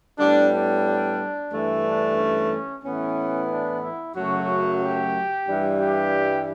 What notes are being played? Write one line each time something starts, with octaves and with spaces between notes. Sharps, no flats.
A2 G3 B3 D4
D4
G2 E3 A3
D4
C#4
A2 E3 B3 C#4
D4
E4
F#2 C#3 F#3 A3 F#4
G4
G2 E3 G3
G4